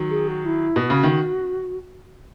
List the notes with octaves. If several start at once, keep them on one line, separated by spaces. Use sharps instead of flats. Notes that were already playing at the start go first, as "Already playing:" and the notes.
Already playing: D#3 F#3
G#4
F#4
E4
B2
F#4
C#3
D#3